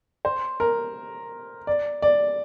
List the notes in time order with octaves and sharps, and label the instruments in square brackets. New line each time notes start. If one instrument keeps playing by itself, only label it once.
[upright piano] C5
A#4
D5
D5